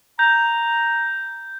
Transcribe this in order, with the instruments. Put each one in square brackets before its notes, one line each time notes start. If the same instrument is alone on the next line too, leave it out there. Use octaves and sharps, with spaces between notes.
[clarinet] A#5 [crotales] G6